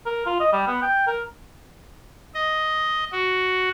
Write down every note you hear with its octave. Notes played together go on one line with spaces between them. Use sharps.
A#4
F4
D#5
G3
B3
G5
A#4
D#5
F#4